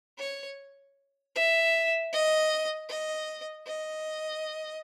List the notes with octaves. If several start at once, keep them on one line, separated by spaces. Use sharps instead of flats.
C#5
E5
D#5
D#5
D#5